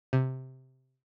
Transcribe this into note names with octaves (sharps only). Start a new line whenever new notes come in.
C3